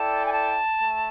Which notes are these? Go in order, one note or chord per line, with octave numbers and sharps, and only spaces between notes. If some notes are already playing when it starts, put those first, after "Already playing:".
Already playing: E4 A4 D5 G5 A5
G#5
A5
A3